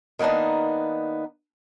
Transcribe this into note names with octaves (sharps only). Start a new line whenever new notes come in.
D#3 A#3 B3 D4 D#4